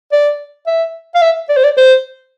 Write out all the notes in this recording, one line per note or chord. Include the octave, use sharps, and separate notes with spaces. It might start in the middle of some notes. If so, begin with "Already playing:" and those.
D5
E5
F5
E5
D5
C5
D5
C5